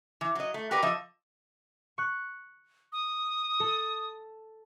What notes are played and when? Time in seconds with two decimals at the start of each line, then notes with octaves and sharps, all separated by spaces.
0.21 E3
0.35 F#3 D#5
0.54 A3
0.71 F#4 G4 A#4 B4 D5
0.82 F3 D#5 E5
1.98 C#6 F#6
2.92 D#6
3.60 A4